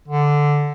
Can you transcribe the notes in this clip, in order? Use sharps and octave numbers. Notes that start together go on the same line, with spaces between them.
D3